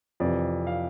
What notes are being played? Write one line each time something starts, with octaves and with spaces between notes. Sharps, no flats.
F2 C3 E3 D5
F5